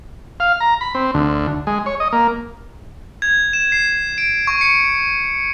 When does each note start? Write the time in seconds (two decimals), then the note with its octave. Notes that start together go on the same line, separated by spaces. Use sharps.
0.40 F5
0.60 A#5
0.81 B5
0.95 C4
1.14 D2
1.67 G#3
1.86 C#5
2.00 D#5
2.12 A#3
3.22 G#6
3.53 E7
3.72 C7
4.18 D7
4.47 C#6
4.61 C#7